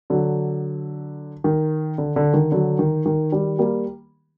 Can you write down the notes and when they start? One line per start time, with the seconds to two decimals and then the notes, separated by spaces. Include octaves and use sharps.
0.10 D3 F#3
1.44 D#3
1.98 D3
2.16 D3
2.34 D#3
2.52 D3 F#3
2.79 D#3
3.06 D#3
3.32 D#3 G3
3.59 G3 A#3